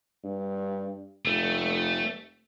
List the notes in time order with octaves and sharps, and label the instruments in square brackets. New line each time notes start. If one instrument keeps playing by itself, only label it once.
[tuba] G2
[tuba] F1 [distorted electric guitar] A3